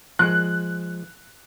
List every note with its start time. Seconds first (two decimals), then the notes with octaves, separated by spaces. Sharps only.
0.19 F3 G#3 F#6